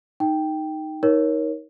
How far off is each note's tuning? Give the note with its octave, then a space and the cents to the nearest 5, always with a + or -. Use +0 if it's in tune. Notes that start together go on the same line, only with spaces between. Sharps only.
D#4 +0 G5 +0
D#4 +20 A#4 +20 C#5 +0